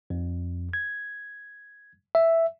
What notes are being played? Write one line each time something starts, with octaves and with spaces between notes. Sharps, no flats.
F2
G#6
E5